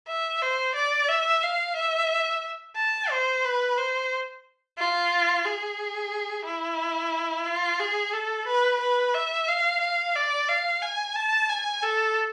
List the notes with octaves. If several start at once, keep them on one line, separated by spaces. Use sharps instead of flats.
E5
C5
D5
E5
F5
E5
A5
C5
B4
C5
F4
G#4
E4
F4
G#4
A4
B4
B4
E5
F5
F5
D5
F5
G#5
A5
G#5
A4